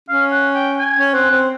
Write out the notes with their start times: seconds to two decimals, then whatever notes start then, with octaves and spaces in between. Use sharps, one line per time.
0.09 C#4 F5
0.31 F#5
0.55 G5
0.79 G#5
0.96 C#4
1.14 C4 F#5
1.31 C4